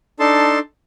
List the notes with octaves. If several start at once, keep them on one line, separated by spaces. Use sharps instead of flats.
D4 D#4 A4 A5 C6